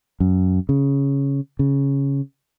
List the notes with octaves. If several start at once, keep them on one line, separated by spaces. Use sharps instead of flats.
F#2
C#3
C#3